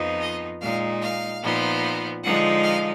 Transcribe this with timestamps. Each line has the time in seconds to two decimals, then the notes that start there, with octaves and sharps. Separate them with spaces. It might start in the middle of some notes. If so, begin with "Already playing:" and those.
Already playing: F2 F3 B3 D#4
0.21 D#5
0.61 A#2 G#3 D#4 F5
1.01 F5
1.42 A#2 F3 B3 D#4
2.23 D3 F3 G#3 D#4 F#5
2.63 F5